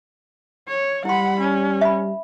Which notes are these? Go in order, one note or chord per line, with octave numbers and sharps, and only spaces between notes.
C#5
G3 E4 F#5 B5 C6
C#4
E5 B5